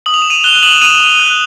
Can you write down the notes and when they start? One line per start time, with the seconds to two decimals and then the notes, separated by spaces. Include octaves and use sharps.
0.06 D#6 F#7
0.14 F7
0.22 D#6 E7
0.30 D#7 F7
0.44 F#6 F7 G7
0.63 D#6 E7 F#7
0.81 D#6 D#7 F7
1.00 D#6
1.20 F#6